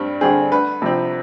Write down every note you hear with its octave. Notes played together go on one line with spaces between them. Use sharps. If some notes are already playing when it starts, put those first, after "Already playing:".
Already playing: G2 G3 C4
D3 G3 C4 G#4
D2 B4
C3 F3 C4